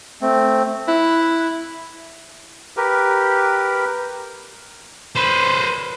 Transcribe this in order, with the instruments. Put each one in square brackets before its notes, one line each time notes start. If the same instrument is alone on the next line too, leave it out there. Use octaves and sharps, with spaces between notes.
[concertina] A3 C4
[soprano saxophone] E4 [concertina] F#6
[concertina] G4 A#4 B4
[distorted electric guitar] B4 C5